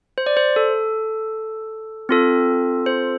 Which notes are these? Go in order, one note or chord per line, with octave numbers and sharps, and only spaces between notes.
C5
D5
C5
A4
C4 F4 A4
C5